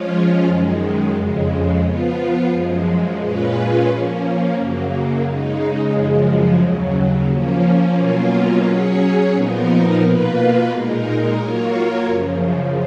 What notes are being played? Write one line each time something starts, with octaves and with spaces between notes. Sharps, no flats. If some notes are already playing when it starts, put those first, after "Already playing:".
Already playing: F3 G#3 C#4 F4
F#2 D#3 G#3
F2 C#3 G#3
F3 B3 F4
F#2 F3 G#3
A#2 G#3 C#4 F4 B4
F3 A#3 C#4
F#2 C#3 F#3 A#3
C#3 G#3 D#4
F#2 C#3 F3 G#3
D#2 C#3 F#3
F3 A#3 C#4
B2 F#3 A#3 C#4 F4
F#3 C#4 G#4 C#5
A#2 F3 B3 D#4 A#4
B2 A#3 F4 B4
A#2 G#3 D#4 A#4
F#3 A#3 F4 A#4 C#5
F#2 C#3 F3